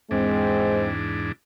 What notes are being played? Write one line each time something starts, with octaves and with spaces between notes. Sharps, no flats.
E2 G#2 G#3 C4 D4